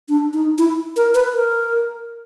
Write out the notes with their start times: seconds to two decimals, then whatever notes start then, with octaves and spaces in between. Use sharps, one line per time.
0.09 D4
0.33 D#4
0.58 E4
0.96 A#4
1.14 B4
1.34 A#4